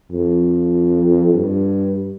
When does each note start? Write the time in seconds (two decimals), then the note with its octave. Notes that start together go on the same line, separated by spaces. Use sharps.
0.12 F2
1.34 G2